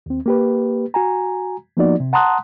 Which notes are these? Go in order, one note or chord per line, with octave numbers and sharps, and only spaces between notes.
D#2 C4
A#3 G4 B4
F#4 G#5 A#5
F3 A#3 B3 D#4 F#4 D5
C3
F#5 A5 A#5 C6 D#6 F#6